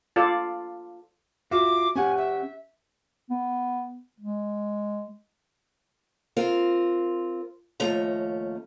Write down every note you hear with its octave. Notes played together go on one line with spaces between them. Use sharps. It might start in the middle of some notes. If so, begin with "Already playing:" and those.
F4 A4 D5
F4 F#4 E5 D6
C#4 G4 F#5 G#5
E5
B3
G#3
C4 F4 A#4
D#2 F3 A3 C#4 A#5